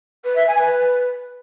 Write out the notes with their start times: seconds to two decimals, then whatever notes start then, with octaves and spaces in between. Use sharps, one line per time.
0.24 B4
0.35 E5
0.47 G#5
0.58 B4